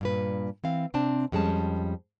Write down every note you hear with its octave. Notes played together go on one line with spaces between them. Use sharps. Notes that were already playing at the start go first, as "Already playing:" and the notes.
G2 A#2 B4
E3 C4 F5
C3 C4 D4 A5
F2 G3 G#3 C#4 A5